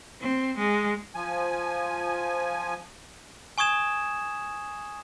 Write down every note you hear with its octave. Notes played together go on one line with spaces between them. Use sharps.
C4
G#3
F3 G#5
G#5 C#6 D#6 G#6 E7